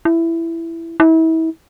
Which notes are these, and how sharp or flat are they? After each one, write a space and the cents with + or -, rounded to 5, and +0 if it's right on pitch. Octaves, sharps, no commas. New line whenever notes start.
E4 +10
E4 -35